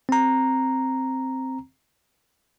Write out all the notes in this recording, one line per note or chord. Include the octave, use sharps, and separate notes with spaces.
C4 A#5